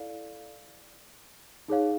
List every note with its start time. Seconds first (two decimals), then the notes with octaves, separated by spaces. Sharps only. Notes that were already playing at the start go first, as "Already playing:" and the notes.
Already playing: E4 A4 D5 F5
1.68 D#4 G#4 C#5 F5